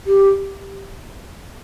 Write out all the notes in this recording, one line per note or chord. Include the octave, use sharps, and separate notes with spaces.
G4